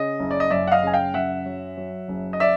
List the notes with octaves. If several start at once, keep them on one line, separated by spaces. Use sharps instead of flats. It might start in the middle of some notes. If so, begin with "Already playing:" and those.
Already playing: C#3 D#5
F#1
D5
D#5
F#2 D5 E5
F#5
D#5 F5
C#3 G#5
F5 G5
F#2 E5 F#5
F#3
F#3
F#1
D#5
D5 E5